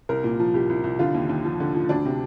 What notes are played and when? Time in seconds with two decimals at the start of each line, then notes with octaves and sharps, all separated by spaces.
0.09 C2 A#4
0.24 A#2
0.40 F3
0.54 C2 G4
0.69 C2
0.84 C2
0.99 D3 F4
1.14 D#2
1.29 D#2
1.45 F3
1.60 D3
1.75 F3
1.89 D2 D4
2.05 C3